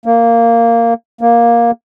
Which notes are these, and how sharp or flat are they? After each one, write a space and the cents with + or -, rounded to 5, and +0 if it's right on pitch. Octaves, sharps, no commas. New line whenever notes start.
A#3 -10
A#3 +10